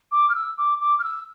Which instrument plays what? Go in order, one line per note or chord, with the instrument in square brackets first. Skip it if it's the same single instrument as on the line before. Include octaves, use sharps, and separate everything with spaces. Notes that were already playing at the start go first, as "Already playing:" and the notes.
[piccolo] D6
F6
E6
D6
D6
F6
E6